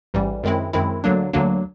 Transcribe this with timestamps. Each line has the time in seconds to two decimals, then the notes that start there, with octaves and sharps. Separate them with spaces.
0.14 A1 G#2 E3 G3
0.44 F#2 D#3 G#3 C4 E4
0.73 F#2 D#3 G#3 C4 E4
1.04 D2 D3 F#3 A#3 D4
1.33 D2 D3 F#3 A#3 D4